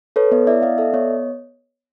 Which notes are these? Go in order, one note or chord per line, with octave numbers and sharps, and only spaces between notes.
A4 B4 C#5
B3 C#5 D#5
E4 D5 E5
B3 D#5 F5
A4 D5 E5
B3 C#5 D#5